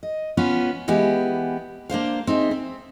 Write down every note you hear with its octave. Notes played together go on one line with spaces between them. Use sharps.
D#5
B3 C#4 F4 B4
E3 G#3 B3 G4
A#3 D4 C5 F5
C4 D#4 G#4 E5
C4